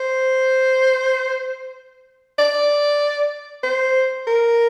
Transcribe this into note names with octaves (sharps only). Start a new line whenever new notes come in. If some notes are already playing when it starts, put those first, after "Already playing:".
Already playing: C5
D5
C5
A#4